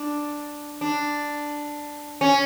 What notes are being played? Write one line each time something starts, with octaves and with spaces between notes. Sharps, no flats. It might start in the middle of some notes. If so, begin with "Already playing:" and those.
Already playing: D4
D4
C#4